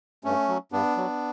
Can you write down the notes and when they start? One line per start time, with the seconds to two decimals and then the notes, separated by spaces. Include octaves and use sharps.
0.24 G2 A3 C#4
0.48 F#3
0.72 G2 B3 D4
0.97 F#3